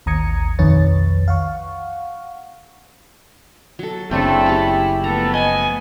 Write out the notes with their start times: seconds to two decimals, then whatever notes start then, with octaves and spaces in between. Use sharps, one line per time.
0.06 A1 D#2 A#5 D#6 G#6 C#7
0.59 B1 F2 D#3 B4 C#5 A6
1.28 F5 F#5 C#6
3.79 F#3 A4
4.11 F#1 C#3 A3 C4 D4 E4 C5
4.46 C#4 G4
5.04 F3 A3 B3 A4 A#5
5.34 D#5 G#5